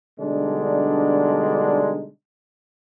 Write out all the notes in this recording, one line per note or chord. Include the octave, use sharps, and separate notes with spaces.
B2 D3 G3 G#3 D4 D#4